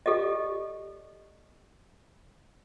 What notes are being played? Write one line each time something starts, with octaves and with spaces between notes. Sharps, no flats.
G4 A4 D5 D#5